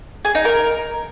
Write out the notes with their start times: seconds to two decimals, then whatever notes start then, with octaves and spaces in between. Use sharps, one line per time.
0.25 G#4
0.35 D#4
0.45 A#4